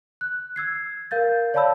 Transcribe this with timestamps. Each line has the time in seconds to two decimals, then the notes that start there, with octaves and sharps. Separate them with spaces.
0.21 F#6
0.56 E6 G#6 C7
1.11 A#4 F5 G6 A6
1.54 C#5 D5 F5 A5 B5 E6